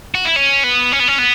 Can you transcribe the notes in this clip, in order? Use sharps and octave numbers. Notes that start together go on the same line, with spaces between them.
F#4
E4
C#4
B3
C#4
B3
C#4
B3